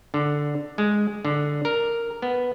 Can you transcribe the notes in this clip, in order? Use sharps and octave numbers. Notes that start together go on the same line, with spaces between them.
D3
G#3
D3
A#4
B3